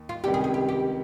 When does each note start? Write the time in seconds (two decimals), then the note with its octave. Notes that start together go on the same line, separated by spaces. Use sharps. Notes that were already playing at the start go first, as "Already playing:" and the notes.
Already playing: D#2
0.09 F4
0.24 C#2 C3 D#3 G3 G4
0.34 G#4
0.44 G#4
0.54 G4
0.69 G4